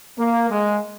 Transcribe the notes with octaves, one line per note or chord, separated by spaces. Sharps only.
A#3
G#3